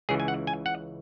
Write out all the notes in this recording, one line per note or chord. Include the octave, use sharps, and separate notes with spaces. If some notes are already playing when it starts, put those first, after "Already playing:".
C#2 C#3 E3 G#4
G#5
F#5
G#5
F#5